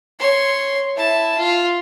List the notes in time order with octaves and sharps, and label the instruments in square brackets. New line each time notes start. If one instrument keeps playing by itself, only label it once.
[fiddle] C#5 C6
E4 A5
F4